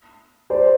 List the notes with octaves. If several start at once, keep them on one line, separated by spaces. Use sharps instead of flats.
C5 D5